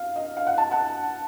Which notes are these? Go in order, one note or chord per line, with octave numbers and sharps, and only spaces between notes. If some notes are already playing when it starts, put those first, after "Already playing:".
Already playing: F5
D#5
F5
F#5
A5
F#5